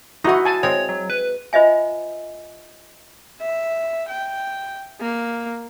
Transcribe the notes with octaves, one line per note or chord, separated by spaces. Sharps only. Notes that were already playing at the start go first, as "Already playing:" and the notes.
D#4 E4 F#4 D#5
G#5 A5
G#3 C4 C#5
F#3
B4
F4 C5 D#5 E5 G#5
E5
G5
A#3